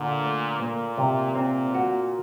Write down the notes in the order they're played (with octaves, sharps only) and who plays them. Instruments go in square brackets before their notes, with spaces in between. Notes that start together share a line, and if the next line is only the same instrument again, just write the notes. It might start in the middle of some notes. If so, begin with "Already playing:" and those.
Already playing: [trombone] A#2 [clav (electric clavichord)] D3
[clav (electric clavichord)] A3
[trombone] A#2 [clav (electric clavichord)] A#3
[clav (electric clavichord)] C3
[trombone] A#2 [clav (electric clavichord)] C4
[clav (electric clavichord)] F#4